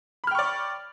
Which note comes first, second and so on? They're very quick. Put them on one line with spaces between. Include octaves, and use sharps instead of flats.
B5 F6 G5 C#6 D5